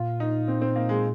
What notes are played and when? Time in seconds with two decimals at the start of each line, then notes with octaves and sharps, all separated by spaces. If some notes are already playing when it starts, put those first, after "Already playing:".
Already playing: A#2 F4
0.20 D#4
0.48 C4
0.61 C4
0.76 A#3
0.89 G#3